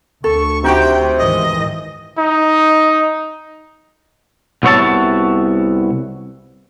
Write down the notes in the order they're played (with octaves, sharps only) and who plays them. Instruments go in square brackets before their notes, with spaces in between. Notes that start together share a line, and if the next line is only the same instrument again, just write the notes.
[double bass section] D2 [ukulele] A4 [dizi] C#6
[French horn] C3 [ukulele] D#4 F#4 G4 [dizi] G5
[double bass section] G#2 D#3 E3 [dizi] D#5
[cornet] D#4
[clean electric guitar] C2 B3 F#4 C#5 E5 A5